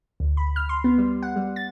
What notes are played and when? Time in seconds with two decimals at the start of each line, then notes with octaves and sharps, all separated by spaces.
0.20 D2
0.37 B5
0.56 F6
0.69 C6
0.84 B3
0.98 G3
1.22 F#5
1.36 G3
1.56 A6